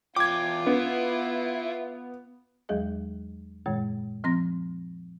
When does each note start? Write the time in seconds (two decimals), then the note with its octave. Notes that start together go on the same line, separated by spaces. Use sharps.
0.16 E2 G#3 F4 G5 D6 G#6
0.66 B3 E4
2.69 E2 F#3 G#3 G#4 D#5
3.66 F#2 A#2 D#3 G#3
4.24 F3 C4 C6 A#6